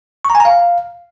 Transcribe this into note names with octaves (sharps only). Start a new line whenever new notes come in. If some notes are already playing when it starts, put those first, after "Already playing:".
C#6
A#5
G#5
A#5
F5